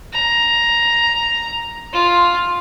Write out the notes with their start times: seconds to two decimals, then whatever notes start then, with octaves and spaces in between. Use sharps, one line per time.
0.13 A#5
1.93 F4